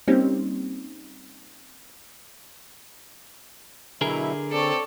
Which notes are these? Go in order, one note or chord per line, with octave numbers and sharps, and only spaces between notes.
G3 A#3 C4 C#4 D#4 G4
B2 D3 F#3 E4 G#4 A#4
C4 A4 C#5 D5